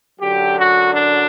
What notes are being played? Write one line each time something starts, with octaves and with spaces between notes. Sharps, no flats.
F#2 D3 F#3 G4
F#4
D4